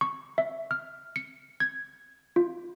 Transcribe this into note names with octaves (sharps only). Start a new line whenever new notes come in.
C#6
E5
F6
C#7
G#6
F4